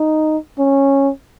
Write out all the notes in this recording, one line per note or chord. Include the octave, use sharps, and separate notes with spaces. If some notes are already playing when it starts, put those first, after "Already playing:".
Already playing: D#4
C#4